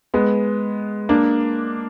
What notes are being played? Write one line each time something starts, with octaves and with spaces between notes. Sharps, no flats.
G#3 B3
A#3 D4